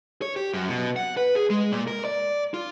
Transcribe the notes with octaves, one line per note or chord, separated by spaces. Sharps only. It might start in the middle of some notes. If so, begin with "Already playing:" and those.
C#5
G4
F#2
B2
F#5
B4
G#4
G#3
A#2
A#4
D5
F4